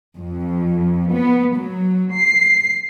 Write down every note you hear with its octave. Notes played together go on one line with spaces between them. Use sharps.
F2
B3
F#3
C7